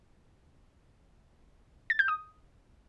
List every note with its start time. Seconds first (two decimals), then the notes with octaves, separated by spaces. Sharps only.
1.90 A6
1.99 G6
2.08 D#6